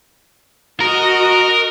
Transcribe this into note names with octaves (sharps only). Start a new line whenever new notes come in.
F#4 A#4 D#5